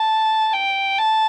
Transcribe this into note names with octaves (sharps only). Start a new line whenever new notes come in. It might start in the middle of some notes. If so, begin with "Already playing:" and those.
Already playing: A5
G5
A5